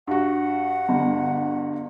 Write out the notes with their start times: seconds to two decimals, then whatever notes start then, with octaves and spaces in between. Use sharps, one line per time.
0.07 G2 F#4 F#5
0.89 G1